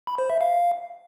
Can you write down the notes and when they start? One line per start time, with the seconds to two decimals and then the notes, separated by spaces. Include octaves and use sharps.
0.07 B5
0.18 C5
0.30 E5
0.41 F5